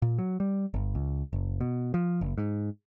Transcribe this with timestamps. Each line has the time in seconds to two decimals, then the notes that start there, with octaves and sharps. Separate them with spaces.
0.02 A#2
0.18 F#3
0.40 G3
0.74 G1
0.95 C#2
1.33 F#1
1.61 B2
1.94 F3
2.21 F#1
2.38 G#2